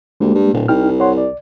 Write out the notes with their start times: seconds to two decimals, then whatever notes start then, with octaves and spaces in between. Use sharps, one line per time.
0.20 D2 G#3 A#3 G4
0.35 G2
0.54 D1 A#2
0.68 C2 D#4 G5 F6
1.00 C#5 F#5 C6
1.18 D5